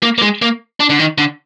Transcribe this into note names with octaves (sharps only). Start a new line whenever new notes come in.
A#3
A#3
G#3
A#3
D4
D3
D#3
D3